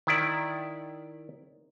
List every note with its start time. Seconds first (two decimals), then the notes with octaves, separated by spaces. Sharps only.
0.07 D#3 E4 D5